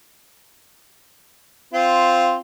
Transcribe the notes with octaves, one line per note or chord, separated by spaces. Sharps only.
C4 F4